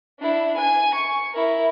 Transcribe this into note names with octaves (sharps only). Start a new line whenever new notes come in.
D4 E4
G#5 G#6
C#6
E4 A#4